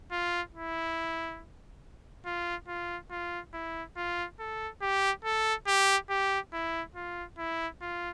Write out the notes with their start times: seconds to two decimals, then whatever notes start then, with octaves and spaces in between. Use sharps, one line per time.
0.12 F4
0.54 E4
2.26 F4
2.68 F4
3.11 F4
3.53 E4
3.97 F4
4.40 A4
4.82 G4
5.25 A4
5.67 G4
6.10 G4
6.53 E4
6.95 F4
7.38 E4
7.82 F4